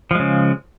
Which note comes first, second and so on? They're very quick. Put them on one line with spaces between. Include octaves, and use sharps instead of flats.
F3 G#3 C#3